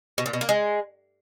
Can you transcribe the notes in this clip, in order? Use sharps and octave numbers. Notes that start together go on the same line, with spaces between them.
B2
A#2
B2
A#3
G#3